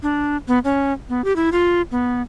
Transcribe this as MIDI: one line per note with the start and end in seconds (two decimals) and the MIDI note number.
0.03 0.37 62
0.48 0.59 59
0.64 0.93 61
1.09 1.24 59
1.24 1.35 67
1.36 1.50 64
1.52 1.82 65
1.92 2.22 59